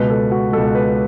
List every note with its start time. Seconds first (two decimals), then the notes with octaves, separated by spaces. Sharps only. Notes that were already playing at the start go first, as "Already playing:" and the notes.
Already playing: C#2 B2 B4
0.10 A4
0.31 F#4
0.53 C#2 B2 A4
0.75 B4